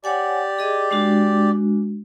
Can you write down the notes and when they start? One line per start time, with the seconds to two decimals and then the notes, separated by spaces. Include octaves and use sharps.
0.04 G4 C#5 D5 F#5 G#5
0.59 G#4 D#5
0.91 G#3 D4 F#4